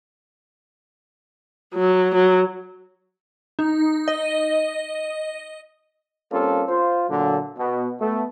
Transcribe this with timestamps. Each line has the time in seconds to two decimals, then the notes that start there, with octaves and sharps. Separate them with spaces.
1.74 F#3
2.15 F#3
3.59 D#4
4.08 D#5
6.31 G3 A#3 C4 C#4 F4 A4
6.68 F4 C5
7.09 A#2 D3 F#3
7.57 B2
8.00 A3 B3 A4